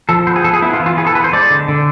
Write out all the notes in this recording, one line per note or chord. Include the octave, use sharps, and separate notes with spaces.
F3 A4
B3 C5
G#4
F3 A4
G#4
B3 E4
F4
E3
F4
B3 G#4
A4
E3 B4
C5
G#3 D5
D3
D3